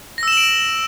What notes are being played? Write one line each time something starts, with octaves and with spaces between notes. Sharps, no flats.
E6 A#6 D7 E7 F#7